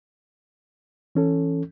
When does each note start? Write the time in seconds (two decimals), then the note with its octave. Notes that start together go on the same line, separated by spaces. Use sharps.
1.15 E3 C#4 A4